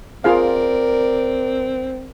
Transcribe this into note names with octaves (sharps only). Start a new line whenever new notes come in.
C4 F4 G#4 A#4 D5 F5